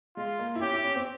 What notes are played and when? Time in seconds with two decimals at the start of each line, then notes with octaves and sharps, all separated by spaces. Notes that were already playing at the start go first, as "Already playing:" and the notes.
0.17 G#3 F4
0.39 A#3
0.55 E4
0.61 C#4 G4
0.73 E4
0.84 C#4
0.96 C4